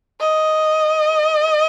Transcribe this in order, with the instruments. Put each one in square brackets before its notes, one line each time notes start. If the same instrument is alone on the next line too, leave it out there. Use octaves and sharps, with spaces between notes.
[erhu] D#5